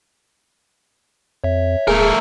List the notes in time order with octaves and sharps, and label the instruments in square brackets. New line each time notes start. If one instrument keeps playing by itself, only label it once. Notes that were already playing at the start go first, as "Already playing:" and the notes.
[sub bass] F2 [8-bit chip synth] C#5 E5
[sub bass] D1 [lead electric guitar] A3 A#4 [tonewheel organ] G#4